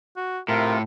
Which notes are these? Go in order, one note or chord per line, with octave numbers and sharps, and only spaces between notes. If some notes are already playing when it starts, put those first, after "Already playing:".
F#4
A2 C3 F4 A#4